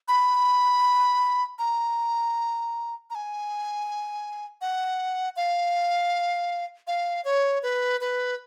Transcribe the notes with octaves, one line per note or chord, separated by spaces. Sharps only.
B5
A#5
A#5
G#5
F#5
F5
F5
C#5
B4
B4